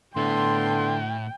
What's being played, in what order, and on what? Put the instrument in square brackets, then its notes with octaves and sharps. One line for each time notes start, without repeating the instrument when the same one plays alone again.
[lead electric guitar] A2 E4 [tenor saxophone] D3 [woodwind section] B3 A5 C6 [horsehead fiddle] G5